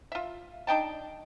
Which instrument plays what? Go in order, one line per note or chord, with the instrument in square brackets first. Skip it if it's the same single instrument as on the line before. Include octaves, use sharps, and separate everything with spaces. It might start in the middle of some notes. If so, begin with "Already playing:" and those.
[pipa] F4 E5
D4 D#4 G5 A5